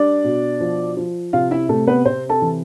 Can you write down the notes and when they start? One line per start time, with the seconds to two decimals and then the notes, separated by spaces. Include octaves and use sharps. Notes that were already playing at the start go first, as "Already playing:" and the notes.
Already playing: G3 D4 D5
0.24 B2
0.60 F3
0.97 F3
1.33 C3 F4 F5
1.51 E4 E5
1.69 C3 A3 A4
1.87 B3 B4
2.05 C3 C4 C5
2.29 A4 A5
2.42 E3